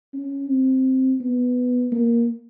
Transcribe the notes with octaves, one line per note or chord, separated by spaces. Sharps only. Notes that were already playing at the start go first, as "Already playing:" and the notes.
C#4
C4
B3
A#3